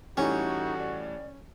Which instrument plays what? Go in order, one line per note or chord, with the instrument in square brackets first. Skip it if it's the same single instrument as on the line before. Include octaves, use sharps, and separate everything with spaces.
[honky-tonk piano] A2 E3 G3 [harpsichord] C#4 [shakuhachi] D#4 [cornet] F#4
[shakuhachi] D5